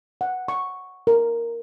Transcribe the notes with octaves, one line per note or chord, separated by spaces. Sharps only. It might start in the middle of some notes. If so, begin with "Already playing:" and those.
F#5
C#6
A#4